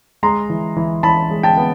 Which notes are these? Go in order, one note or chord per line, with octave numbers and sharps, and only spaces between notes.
G#3 A#5 C6
E3
E3
E3 A5 B5
G#3
G5 A5
B3